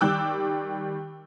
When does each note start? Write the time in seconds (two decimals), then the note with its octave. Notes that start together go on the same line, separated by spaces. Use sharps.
0.01 D#3 G3 G5 D6 E6 F#6